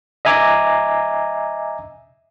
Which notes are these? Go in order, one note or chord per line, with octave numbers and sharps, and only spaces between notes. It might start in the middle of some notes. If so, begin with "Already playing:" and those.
D#5 E5 G#5 A#5 D6